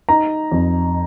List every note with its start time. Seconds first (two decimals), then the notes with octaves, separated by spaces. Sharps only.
0.09 D#4 A#5
0.52 F2